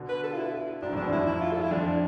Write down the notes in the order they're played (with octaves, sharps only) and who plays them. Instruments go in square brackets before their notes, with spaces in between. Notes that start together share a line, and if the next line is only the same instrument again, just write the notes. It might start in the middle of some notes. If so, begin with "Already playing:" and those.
Already playing: [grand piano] B2 D3
[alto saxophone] B4
A4
F4
E4
[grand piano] G#2 B2 [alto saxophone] D4
[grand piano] F2 A2
[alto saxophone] D4
[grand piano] G#2 B2
[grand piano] F2 A2 [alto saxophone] E4
[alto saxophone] E4
F4
A4
E4
[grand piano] F2 [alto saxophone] D4